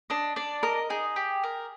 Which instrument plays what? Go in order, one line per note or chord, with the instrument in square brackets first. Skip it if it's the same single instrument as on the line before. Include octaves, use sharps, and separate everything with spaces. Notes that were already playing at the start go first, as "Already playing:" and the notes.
[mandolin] D4 [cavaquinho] D#5
[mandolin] D4 [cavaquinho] D5
[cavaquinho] A#4 [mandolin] D#5
[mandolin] D#4 [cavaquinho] G#4
[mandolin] G4
A#4